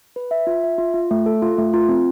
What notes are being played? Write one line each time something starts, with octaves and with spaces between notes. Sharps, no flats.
B4
E5
F4
E5
F4
F4
A3
A4
F4
A3
F4
C4